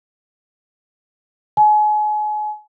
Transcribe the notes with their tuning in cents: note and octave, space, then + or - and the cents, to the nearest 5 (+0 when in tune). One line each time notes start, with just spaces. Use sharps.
G#5 +35